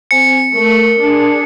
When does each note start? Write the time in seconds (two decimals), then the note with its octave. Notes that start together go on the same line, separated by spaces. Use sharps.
0.11 C4 C5 G#5 C#7
0.54 A3 A#4
1.00 D4 G#4